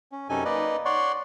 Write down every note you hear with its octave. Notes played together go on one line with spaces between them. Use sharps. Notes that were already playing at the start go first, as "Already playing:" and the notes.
C#4
F#2 C3 C#4 D#4 A4 G#5
A#3 D#4 B4 D5 D#5
C#5 D5 F#5 C6 C#6